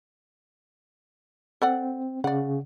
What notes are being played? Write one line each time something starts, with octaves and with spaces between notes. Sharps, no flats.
C4 A4 D5 F#5
C#3 D5 F#5